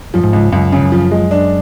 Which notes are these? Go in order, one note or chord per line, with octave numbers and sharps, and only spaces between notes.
F#2 F3
G#2
C#2
C#2 F#2
C#3
F#2
F3
G#3
D4